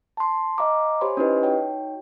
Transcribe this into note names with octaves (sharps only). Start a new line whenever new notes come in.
A5 C6
D#5 F5 G#5 A#5 D6
G4 C5 C#5 G#5 B5 C6
C#4 D#4 E4 G4 B4 D#5
D#4 F#4 C#5 G5